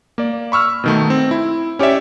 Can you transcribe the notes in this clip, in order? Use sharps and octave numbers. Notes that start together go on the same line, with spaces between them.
A#3 D5
B5 C#6 E6 F6
B2 D#3 A3
C4
E4
C#4 G4 C#5 D5 E5